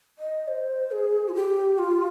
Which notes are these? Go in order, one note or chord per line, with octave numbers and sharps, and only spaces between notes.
D#5
C5
G#4
F4
G4
F4